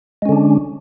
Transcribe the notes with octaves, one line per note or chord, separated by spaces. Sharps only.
D3 G#3 C#4 D4